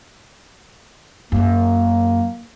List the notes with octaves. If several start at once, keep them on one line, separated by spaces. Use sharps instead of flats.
F#2 A#3